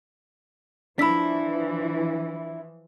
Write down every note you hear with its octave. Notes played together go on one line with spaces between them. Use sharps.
E3 F3 D4 E4 B5 E6 B6